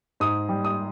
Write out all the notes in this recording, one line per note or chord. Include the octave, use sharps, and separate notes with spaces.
G#2 D#6
G3
D#6